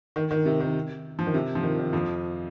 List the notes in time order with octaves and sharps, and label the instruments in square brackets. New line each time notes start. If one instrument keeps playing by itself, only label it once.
[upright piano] D#3
D#3
C3
D#3
F3
D#3
C3
F3
D#3
D#3
F2 F3